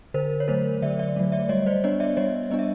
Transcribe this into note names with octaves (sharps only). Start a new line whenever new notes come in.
D3 A#4 C5
C#5
F#3 A3 A#4 C5
D3 D5 E5
D5 E5
F#3 A3
D5 E5
G3 C#5 D#5
C5 D5
B3 D4 C#5 D#5
D5 E5
G3 C#5 D#5
B3 D4 D#5
E5